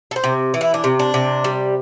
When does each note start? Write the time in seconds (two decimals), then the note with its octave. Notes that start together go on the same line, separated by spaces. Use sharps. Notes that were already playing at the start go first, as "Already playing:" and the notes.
0.11 A4
0.16 C5
0.24 C3
0.54 E3
0.61 E4
0.74 D4
0.84 C3
0.99 D4
1.14 C3
1.44 G3